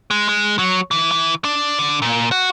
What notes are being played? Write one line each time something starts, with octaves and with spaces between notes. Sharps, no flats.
G#3
G#3
F#3
E3
E3
D4
D3
A#2
F#4